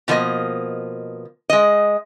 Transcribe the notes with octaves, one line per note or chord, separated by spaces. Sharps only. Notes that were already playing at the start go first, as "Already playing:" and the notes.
B2 F3 A#3 D#5
G#3 D#5